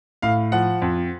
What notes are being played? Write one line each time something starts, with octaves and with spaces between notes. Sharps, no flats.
A2 F5
F3 F#5
F2